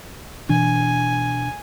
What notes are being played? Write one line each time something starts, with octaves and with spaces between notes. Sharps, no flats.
B2 E3 D4 G#5